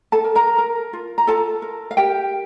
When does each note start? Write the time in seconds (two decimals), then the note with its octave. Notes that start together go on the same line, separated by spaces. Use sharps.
0.12 A4 A5
0.24 A#4
0.35 A#4 A#5
0.58 A#4
0.93 F4
1.18 A#5
1.27 F4 A4 A5
1.62 A#4
1.91 F5
1.97 G4 A#4 G5